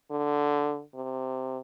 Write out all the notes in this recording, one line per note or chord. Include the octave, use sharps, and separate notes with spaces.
D3
C3